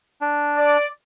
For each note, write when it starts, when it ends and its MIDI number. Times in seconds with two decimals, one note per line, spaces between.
0.21 0.77 62
0.57 0.85 74